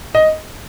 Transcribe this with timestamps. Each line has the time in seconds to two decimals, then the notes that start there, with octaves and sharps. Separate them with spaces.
0.15 D#5